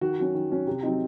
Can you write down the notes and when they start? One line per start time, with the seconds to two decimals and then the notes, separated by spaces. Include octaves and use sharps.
0.01 D#3 F#4
0.18 F#3 C#4
0.34 D#3
0.50 F#3 C#4
0.67 C3
0.83 F#3 C4 D#4